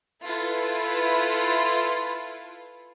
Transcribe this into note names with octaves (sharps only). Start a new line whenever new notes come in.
E4 F4 A4 B4